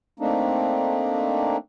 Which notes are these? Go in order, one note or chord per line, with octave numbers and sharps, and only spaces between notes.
A3 A#3 C4 D4 D#4